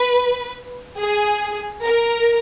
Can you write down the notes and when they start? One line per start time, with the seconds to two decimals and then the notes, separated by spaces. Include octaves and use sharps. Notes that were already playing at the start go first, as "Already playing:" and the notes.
Already playing: B4
0.99 G#4
1.82 A#4